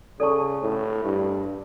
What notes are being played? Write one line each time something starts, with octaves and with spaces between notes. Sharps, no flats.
C#3 A4 D5 A5 C#6
A2
G2